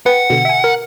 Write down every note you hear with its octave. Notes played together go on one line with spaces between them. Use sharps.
B4 F#5 G5
B2 D3
E5 G#5
A#4